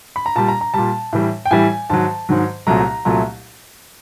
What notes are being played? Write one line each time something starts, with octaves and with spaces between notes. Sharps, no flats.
B5
A#5
A#2 G3 A5
A#5
A#5
A#2 G3 A5
A2 E3 G3
G5
A2 E3 G3 G#5
G#2 D#3 F#3 A5
G#2 D#3 F#3
C2 A#2 F#3 A3 A#5
C2 A#2 F#3 A3 A#5